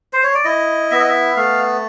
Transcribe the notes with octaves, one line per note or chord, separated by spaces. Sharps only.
C5
C#5
D5
E4 D#5
B3 E5
D#5
E5
A3 F5